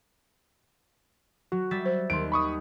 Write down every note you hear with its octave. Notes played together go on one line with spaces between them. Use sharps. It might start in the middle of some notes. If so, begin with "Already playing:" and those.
F#3 F#4
G3 E5 A6
C5
D#2 C6 D7
B5 C#6 D#6